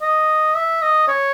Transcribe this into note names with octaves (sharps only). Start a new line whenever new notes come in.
D#5
E5
D#5
C#5